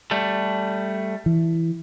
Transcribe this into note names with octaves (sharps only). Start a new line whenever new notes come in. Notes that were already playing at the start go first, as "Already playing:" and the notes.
G3 A3
E3